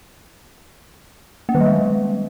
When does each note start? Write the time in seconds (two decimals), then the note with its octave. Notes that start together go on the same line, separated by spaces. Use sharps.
1.49 A#3
1.55 D#3
1.60 G3
1.66 G#3